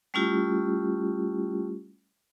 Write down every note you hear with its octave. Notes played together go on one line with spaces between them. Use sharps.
G3 A3 C#4 E4 F4 G4